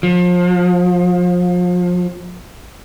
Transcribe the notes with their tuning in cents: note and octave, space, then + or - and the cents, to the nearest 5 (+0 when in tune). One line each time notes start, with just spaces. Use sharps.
F3 +35